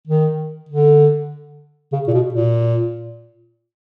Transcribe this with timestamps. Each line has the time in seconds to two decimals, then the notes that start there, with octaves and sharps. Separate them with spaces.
0.07 D#3
0.69 D3
1.92 C#3
2.08 A#2
2.14 B2
2.34 A#2